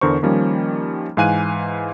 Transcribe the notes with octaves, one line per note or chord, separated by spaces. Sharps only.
E2 D3 A#4 C5 C#6
D#3 F3 G3 A#3 C#4
G#2 E3 F5 G#5 F#6 D#7